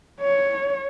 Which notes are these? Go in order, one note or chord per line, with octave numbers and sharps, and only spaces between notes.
C#5